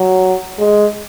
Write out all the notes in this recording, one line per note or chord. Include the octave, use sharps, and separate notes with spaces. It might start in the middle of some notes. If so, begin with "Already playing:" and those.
Already playing: F#3
G#3